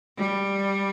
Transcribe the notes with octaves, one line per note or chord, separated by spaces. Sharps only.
G3